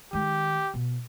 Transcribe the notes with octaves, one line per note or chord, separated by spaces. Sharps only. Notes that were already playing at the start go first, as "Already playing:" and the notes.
D#3 G#3 G4
B2